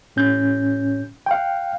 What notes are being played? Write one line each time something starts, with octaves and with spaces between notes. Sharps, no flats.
A2 C#4 G6
F5 G5